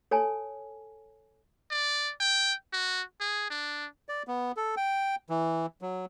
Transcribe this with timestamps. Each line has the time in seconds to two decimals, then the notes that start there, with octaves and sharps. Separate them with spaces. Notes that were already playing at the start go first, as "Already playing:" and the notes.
0.11 A4 C#5 G#5 A5
1.71 D5
2.20 G5
2.73 F#4
3.20 G#4
3.50 D4
4.09 D5
4.28 B3
4.57 A4
4.77 G5
5.30 E3
5.82 F#3